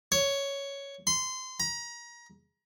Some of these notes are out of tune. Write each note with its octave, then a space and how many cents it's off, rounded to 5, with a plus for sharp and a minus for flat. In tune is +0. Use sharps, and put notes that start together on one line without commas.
C#5 +5
C6 -25
A#5 +30